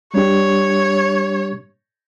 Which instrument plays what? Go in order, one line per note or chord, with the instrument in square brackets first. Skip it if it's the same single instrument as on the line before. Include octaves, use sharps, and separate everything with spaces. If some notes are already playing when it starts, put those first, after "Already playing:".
[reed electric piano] G3 D4 G4 [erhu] C#5